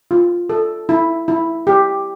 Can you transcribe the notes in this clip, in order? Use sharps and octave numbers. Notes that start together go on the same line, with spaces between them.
F4
A4
E4
E4
G4